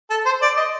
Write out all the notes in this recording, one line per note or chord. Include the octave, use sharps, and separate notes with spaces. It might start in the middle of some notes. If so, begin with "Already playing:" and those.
A4
C5
D5
D#5